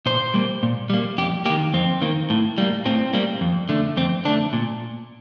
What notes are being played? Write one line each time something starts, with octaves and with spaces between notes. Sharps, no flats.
A#2 C5
G3 A#3
A#2
G3 A#3
F2 G4
D#3 A#3 G4
F2 C4
D#3 A#3
A2
G3 A#3
A2 C4
G3 A#3
F2
D3 A3
F2 C4
D3 A3 D4
A#2